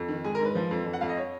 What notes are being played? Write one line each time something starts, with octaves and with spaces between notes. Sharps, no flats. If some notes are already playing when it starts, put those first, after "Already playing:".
Already playing: F2
D#3
G#2 G#4
A#4
G#2
B4
F3
F2
F2
F#5
F2 F5
D#5
C#5